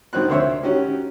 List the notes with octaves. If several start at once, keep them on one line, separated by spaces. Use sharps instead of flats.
A#1 D#3 C4 F#4 F#6
D2 C5 C#5 E5
D#3 C#4 F#4 G4